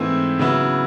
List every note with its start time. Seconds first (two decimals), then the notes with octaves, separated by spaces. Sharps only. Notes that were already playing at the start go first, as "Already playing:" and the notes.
Already playing: G#2 E3 A3 C4 E4
0.39 C#3 F#3 B3 E4